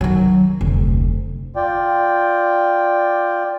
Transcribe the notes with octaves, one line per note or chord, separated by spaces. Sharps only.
D#3 F#3
F1 D2
F4 D5 G5